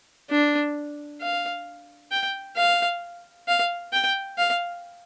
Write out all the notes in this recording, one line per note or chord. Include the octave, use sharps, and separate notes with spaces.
D4
F5
G5
F5
F5
G5
F5